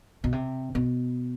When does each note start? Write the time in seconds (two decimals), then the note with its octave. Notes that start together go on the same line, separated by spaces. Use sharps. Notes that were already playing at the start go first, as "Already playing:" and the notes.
0.24 B2
0.32 C3
0.75 B2